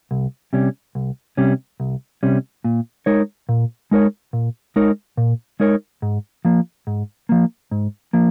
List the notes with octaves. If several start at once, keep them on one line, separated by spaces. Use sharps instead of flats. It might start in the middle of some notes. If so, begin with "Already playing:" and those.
C2
C3 G3 C#4
C2
C3 G3 C#4
C2
C3 G3 C#4
A#2
G#3 D#4 A#4 C#5
A#2
G#3 D#4 A#4 C#5
A#2
G#3 D#4 A#4 C#5
A#2
G#3 D#4 A#4 C#5
G#2
F3 A#3
G#2
F3 A#3
G#2
F3 A#3